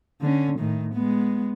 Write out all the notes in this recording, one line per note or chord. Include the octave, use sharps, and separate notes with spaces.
D3 C#4
A2 D#3
G#3 B3